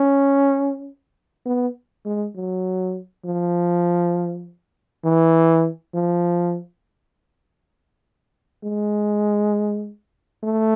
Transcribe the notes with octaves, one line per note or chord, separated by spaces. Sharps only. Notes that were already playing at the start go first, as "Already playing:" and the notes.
Already playing: C#4
B3
G#3
F#3
F3
E3
F3
G#3
A3